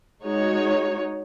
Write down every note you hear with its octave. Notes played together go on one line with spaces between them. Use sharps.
G#3 D#4 F#4 C#5